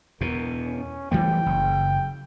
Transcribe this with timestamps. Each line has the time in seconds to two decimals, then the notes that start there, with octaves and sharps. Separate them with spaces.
0.21 E2 B2 A#4
0.65 C#4
1.12 E3 G3 A3 G5
1.46 F#1